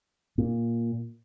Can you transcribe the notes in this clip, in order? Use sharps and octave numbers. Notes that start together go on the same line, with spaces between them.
A#2